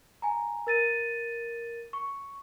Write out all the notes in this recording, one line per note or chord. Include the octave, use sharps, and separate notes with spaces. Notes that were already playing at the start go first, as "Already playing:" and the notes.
G#5 A#5
A#4 A6 D#7
C#6